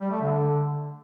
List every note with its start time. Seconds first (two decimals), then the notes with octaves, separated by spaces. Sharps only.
0.01 G3
0.11 A3
0.21 D3